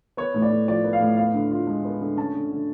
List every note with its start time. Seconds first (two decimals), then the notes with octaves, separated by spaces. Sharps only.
0.17 B3 C#5
0.34 A2
0.42 D5
0.50 A2
0.68 F3 D5
0.84 B3
0.93 F5
1.00 A2
1.17 B3 F5
1.34 D3
1.51 F4
1.67 G#3
1.85 B3
2.01 D3
2.17 C#4 A5
2.34 D3
2.52 D3